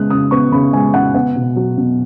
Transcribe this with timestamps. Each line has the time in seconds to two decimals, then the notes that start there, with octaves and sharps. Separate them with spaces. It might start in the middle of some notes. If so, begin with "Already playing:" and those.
Already playing: C#3 G#3 B3 D#6 F#6
0.10 C#3 D#6
0.31 B3 C#6
0.52 C#3 B5
0.73 G#3 G#5
0.94 C#3 F#5
1.14 B3 F#5
1.36 B2
1.56 F#3
1.78 B2